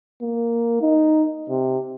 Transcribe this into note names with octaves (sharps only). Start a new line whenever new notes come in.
A#3
D#4
C3